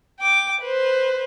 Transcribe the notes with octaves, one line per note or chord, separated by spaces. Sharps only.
G5 D6
B4 C5